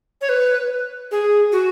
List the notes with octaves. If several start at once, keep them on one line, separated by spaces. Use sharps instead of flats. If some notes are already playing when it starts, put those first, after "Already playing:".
C#5
B4
G#4
F#4